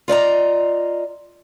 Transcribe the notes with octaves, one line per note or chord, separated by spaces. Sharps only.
F4 D5 D#5 A#5